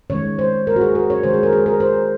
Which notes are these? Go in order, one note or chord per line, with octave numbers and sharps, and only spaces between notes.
D#3 G#3 C#5
C5
A#4
F#4
G#4
A#4
C#5
D#3 G#3 C5
G#4
A#4
G#4
A#4
C5